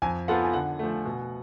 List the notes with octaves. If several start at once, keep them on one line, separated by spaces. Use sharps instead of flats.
F2 G#5
F3 B3 F4 A4 F#5
G#5
D3 F#5
F3 A3
B2